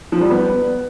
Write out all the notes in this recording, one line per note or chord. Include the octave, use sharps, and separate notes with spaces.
F3
G3
B3